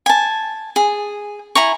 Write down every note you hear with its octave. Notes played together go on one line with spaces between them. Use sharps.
G#5 A5
G#4
E4 G#5 A#5 C#6